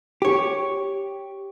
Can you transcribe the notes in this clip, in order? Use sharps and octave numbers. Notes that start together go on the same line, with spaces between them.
G4 C#5